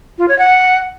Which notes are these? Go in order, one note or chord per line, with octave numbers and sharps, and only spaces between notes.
F4
C#5
F#5